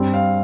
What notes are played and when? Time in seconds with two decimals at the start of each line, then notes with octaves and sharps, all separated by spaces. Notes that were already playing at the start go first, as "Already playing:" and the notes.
Already playing: G2 G3 C4
0.14 F5